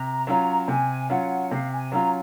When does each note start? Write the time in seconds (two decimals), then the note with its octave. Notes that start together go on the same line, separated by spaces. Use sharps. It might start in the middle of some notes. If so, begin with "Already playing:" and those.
Already playing: C3 A#5
0.27 F#3 C#4 F4
0.64 A#5
0.68 C3 G#5
1.09 F#3 C#4 F4 F#5
1.51 C3 F5
1.71 G#5
1.92 F#3 C#4 F4 A#5